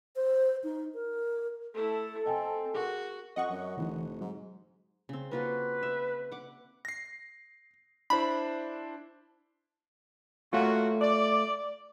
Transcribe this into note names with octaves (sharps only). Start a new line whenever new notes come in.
C5
D#4
A#4
A3 E4 A4
C4 D#5 G5 G#5
F#4 G#4 A#4
F2 D#5 F#5 C#6
F#2
F1 D3 E3
G#2 F#3
C#3 C4
A#3 F4 F#4 B4
E5
F#5 D6
A#6 C7
D4 E4 C5 B5
A3 A#3 C#4 F4 F#4
D5